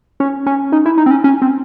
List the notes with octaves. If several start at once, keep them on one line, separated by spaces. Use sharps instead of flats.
C#4
C#4
D#4
E4
D#4
C4
C#4
C#4
C4